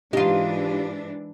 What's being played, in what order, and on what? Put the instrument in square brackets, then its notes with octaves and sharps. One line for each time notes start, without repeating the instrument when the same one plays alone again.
[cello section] G#2 E3 D4 [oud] D#4 F4 [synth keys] G4 D#7